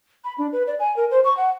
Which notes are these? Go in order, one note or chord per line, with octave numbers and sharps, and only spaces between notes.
B5
D4
B4
D5
G#5
A#4
C5
C#6
F#5